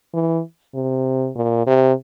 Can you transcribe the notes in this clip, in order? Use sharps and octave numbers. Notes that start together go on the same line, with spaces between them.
E3
C3
A#2
C3